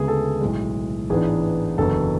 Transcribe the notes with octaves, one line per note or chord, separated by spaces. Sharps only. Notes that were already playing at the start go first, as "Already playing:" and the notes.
Already playing: D2 C#3 G#3 B3 G#4
A4
B1 A2 G#3
A1 G#2 E3 B3 D4 G#4
F#1 E2 D3 F#3 B3 A4